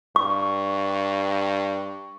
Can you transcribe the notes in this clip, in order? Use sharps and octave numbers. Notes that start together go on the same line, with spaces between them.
G2 C#6